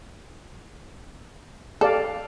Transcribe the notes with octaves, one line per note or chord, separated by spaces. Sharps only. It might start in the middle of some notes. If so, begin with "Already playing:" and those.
G4 A4 D5 F5